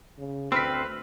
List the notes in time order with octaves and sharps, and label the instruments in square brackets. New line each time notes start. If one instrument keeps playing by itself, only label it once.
[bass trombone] C#3
[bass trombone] D2 [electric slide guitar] C4 [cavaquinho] B4 [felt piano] E6 F6 B6